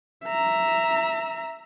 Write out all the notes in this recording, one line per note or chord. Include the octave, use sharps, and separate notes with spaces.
E5 A#5